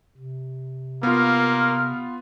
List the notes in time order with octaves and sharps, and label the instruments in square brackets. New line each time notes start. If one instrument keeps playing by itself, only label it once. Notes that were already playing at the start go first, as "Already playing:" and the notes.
[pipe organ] C3
[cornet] A#3 [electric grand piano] B3 F4 [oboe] A#4